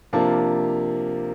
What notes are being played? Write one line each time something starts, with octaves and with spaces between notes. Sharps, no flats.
C3 F3 A#3 D4 F5 A5